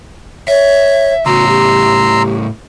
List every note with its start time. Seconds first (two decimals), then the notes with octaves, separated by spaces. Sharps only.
0.48 C#5 E5
1.26 A2 C#3 F#4 A#5 C6 E6
1.48 G4